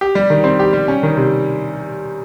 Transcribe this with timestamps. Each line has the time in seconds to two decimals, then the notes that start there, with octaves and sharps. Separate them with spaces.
0.01 G4
0.15 G3
0.30 D#3
0.44 C4
0.59 G4
0.73 G3
0.88 C#4
1.03 D#3
1.17 C3